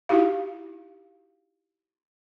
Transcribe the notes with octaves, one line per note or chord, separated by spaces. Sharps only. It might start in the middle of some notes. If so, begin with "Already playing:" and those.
D#4 E4 F#4 G4 F5